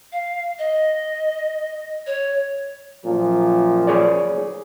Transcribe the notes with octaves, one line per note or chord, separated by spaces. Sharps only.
F5
D#5
C#5
F#2 A#2 F3
G#4 C#5 D5